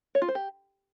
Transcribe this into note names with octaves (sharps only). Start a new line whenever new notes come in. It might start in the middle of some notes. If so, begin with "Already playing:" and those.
C#5
F4
C5
G4